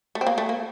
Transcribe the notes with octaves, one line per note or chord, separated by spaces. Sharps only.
A3
C4
A#3
A3
A#3